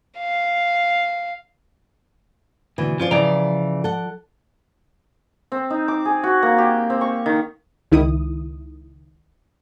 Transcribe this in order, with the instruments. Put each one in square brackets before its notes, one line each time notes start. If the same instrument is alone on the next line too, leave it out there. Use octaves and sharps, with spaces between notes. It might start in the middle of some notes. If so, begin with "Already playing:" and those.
[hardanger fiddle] F5
[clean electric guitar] D2 B2 [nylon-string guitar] E3
[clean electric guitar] F3 [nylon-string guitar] C#4 F4 D5
[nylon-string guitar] C#3 E3 [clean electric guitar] F3 D5 A#5
[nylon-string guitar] A4 F#5
[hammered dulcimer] C4
D#4
D6
G#4
F#4
A#3
G4
C4
C#6
D#3
[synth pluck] C#2 D#3 E4 D#6